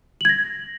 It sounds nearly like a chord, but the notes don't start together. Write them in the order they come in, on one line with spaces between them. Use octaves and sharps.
F#7 G#6 A#6